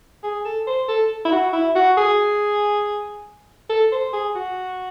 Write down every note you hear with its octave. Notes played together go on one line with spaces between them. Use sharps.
G#4
A4
C5
A4
E4
F#4
E4
F#4
G#4
A4
C5
G#4
F#4